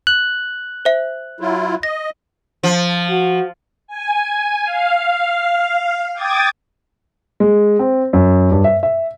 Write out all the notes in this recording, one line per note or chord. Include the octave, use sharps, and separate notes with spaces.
F#6
C5 E5
F#3 E4 F4
D#5 A#6
F3
F#4
G#5
F5
G5 D6 D#6 G#6 A6
G#3
C4
F#2
G2
E5
E5